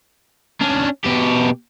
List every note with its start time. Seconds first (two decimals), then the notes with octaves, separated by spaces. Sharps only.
0.61 C#4 D4
1.04 B2 G4